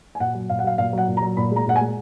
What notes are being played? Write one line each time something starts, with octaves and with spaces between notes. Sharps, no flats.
G#5
A#2 F#5
F#3
A#2 F5
F#5
F#3 F5
A#2 F5
F#3 F#5
A#2
A#5
F#3
A#2 B5
G#3 A#5
A#2 F#5
G#5
G#3